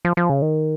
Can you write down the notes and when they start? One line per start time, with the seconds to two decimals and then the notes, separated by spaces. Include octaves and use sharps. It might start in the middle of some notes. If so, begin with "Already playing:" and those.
0.05 F3
0.17 F3
0.30 C#3
0.42 D#3